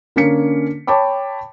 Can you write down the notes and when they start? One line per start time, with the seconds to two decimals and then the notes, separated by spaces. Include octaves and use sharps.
0.16 D3 A#3 C#4 B6 C#7
0.87 C#5 G5 A5 B5 D6